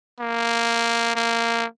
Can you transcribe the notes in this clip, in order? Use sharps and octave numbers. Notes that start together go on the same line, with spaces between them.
A#3
A#3